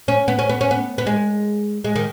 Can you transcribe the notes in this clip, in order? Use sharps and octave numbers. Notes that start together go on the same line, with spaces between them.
C#4
B3
C#4
B3
C#4
B3
B3
G#3
G#3
D#3